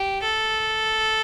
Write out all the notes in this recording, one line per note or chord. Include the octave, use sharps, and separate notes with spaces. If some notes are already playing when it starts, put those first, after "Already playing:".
Already playing: G4
A4